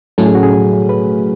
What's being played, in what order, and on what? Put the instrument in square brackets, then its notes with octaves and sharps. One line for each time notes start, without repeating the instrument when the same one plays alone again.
[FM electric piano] A2 F#3 A3 C#4 [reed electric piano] A4
[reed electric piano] G#4
F#4
G#4
B4